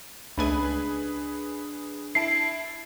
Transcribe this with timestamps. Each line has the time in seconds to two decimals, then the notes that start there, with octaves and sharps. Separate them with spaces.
0.38 C#2 A3 D4 G#4 B4 G#5 B5
2.15 E4 A5 C7 D7